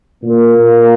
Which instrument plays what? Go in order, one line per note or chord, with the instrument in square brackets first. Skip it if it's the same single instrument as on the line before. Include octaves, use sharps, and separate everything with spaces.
[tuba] A#2 [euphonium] A#3
[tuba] A#2